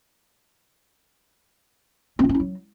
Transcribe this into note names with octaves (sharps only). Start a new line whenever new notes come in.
C4
F4
C#4
E4
F#3